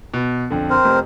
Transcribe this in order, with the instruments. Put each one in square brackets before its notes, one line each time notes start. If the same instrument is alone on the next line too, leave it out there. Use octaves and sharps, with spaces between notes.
[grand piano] B2
F2 D3
[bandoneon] C4 A#4 C5
[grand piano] F1